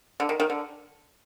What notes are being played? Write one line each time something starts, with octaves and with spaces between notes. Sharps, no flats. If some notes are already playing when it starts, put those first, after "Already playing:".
D3
D#3
D#3
D3